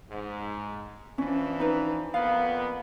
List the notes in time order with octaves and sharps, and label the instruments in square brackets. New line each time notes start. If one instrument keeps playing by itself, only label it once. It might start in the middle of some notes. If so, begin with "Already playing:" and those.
[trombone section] G#2
[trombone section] E3 F3 D4 [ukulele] C#4
[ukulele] D#4 B4
[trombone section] F2 A#3 B3 [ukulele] F5